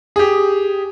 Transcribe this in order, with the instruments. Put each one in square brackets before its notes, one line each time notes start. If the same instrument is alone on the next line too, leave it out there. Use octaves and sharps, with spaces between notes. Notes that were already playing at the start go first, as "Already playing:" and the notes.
[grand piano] G4 G#4